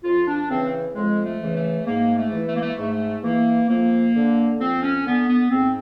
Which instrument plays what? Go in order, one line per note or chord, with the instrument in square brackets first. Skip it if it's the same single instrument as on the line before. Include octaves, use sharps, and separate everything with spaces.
[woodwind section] F2 F4
D4
C#3 E3 C4
F2 G#3
A3
C#3 E3
A3
G#2 A#3
A3
E3
A3
A#3
A3
G#2 A3
E3 A#3
F2 A#3
D3
F2 C4
C#4
D3 B3
B3
G#2 C4